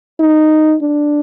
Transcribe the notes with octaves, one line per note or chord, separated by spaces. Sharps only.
D#4
D4